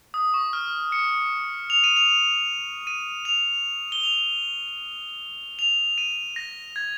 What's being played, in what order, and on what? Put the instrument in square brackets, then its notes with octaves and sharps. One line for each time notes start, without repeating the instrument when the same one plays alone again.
[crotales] D#6
C#6
F6
C#7
F7
D#7
F7
D#7
F7
G7
F7
F7
D#7
A#6
G#6